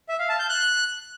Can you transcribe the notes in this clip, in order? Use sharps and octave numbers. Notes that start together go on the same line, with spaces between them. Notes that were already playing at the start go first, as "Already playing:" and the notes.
E5
F5
A5
G6
F#6